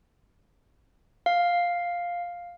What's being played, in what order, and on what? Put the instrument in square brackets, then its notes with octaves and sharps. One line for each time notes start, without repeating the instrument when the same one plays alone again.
[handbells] F5